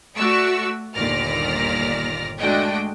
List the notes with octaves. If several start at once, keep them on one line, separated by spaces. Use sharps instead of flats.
A3 F#4 D5 C#6 E6
G1 D#2 A#2 D5 F6 A#6
G#3 A3 D4 F#4 D#5 G5